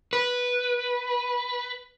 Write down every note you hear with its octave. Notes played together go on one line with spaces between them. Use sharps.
B4